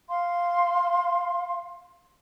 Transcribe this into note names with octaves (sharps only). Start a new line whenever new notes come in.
F5 C6